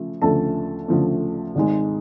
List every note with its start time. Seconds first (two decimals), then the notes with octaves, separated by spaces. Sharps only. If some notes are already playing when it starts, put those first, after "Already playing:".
Already playing: C#3 F3 A3
0.22 D2 C#3 F3 A3 A4 A5
0.88 D2 C#3 F3 A3
1.55 G#1 G#2 G#3